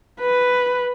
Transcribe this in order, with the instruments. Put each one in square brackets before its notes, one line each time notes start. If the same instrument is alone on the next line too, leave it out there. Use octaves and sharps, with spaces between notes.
[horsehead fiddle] B4